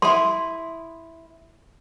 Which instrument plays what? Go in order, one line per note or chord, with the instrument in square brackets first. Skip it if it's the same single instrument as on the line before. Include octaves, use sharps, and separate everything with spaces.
[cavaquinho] E4 D#6 [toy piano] C6